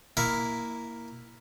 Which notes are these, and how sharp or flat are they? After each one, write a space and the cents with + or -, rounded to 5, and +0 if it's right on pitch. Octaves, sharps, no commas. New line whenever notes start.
A#3 +0 E4 +0 F#5 -45